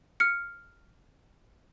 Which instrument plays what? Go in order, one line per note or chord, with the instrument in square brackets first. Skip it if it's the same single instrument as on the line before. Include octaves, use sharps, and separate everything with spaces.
[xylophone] F6 C#7